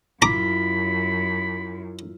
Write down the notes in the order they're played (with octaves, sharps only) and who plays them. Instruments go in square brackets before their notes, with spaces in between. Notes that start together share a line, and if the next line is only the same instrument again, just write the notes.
[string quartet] F#2 [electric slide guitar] E4 F4 [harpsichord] A#5 D6 [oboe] B5